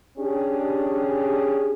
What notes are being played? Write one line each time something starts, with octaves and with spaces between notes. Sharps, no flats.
C#4 D4 G4 G#4